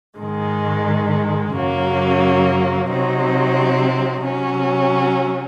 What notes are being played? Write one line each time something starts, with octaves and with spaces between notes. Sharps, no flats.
G#2 D#3 G#3
F#2 C#3 F#3 A#3
C3 F#3 C4 D#4
C3 F#3 C#4